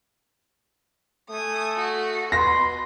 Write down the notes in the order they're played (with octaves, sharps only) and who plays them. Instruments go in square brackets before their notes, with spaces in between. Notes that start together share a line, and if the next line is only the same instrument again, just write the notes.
[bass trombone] A3 [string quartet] G#5 D#6
[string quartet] F#4
[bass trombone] B2 [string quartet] B4 [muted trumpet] C6 [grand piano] A#6